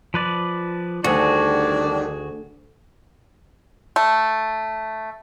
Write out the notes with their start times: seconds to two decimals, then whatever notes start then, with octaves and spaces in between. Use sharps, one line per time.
0.14 F3 B4 D5
1.04 D2 D#3 G3 D4 F#4 G#4
3.96 A3